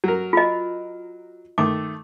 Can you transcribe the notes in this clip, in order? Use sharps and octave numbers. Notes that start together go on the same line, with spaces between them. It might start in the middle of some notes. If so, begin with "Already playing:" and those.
F#3 A#4
F4 D#5
D#3 A3 D6